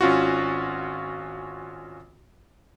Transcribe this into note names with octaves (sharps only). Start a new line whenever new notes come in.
G#1 C#4 F4 F#4